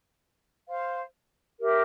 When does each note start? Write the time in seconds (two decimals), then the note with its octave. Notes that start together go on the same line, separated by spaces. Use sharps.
0.70 C5 F5 C6
1.60 G4 A#4 E5